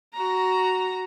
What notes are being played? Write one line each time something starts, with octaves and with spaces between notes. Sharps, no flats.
F#4 A#5